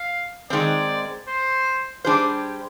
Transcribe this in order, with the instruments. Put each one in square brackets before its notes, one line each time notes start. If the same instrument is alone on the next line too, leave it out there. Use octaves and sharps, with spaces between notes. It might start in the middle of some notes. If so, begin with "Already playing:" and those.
Already playing: [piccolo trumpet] F5
[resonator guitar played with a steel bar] D#3 G#3 C4 [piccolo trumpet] D5
[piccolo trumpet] C5
[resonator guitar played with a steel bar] G3 D4 G#4 C5 [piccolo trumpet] G4